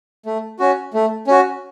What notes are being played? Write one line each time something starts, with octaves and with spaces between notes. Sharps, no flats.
A3
C#4 F#4
A3
C#4 F#4